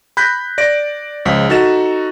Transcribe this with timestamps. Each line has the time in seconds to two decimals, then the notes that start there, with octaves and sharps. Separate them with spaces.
0.17 B5 F#6 G6 A#6 B6
0.58 D5 A#6 D7
1.25 C#2 F3 B6
1.49 D#4 F#4 A4 A6 E7